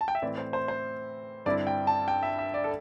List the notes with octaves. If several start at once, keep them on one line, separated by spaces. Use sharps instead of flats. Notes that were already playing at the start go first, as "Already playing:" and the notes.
A5
G5
E5
A2 E3 C4 E4 D5
C5
C5
C5
G2 D3 C4 E4 D5
G5
A5
G5
E5
E5
D5
A4